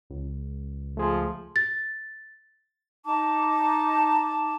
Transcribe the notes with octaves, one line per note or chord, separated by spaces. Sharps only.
C#2
F3 A3 G#4
A6
D#4 A5 D6